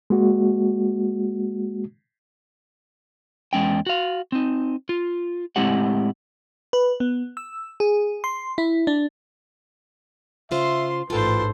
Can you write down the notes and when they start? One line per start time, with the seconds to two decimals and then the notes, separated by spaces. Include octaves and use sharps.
0.10 G#3 A#3 F#4
3.53 E2 G#3 C#4 G5
3.86 F#4 F5
4.32 C4 D#4
4.89 F4
5.56 A2 G#3 C4 E4 G4 F#5
6.73 B4
7.00 B3
7.37 E6
7.80 G#4
8.24 C6
8.58 E4
8.87 D4
10.51 C#3 F4 C5 E5 C6
11.10 A1 G#2 F4 A4 B4 C5 G5